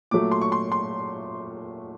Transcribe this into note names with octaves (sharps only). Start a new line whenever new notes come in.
A#2 F#3 A3 D6
C6
C#6
C6
C6